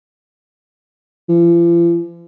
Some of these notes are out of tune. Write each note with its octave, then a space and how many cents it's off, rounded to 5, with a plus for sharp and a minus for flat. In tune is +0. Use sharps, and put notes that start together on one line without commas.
F3 -45